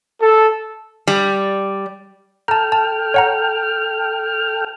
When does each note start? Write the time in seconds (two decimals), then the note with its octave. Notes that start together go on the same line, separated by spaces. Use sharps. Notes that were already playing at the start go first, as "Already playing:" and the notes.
0.21 A4
1.08 G3
2.48 A4 G5 A5 A#5 F6
2.72 A5
3.14 C#5 F#5 A#5